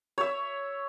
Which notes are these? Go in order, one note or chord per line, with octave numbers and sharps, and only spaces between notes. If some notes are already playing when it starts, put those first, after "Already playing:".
C#5 E5